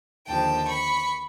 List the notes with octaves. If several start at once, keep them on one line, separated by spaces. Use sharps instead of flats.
D#2 D3 F3 G5 A5
B5 C#6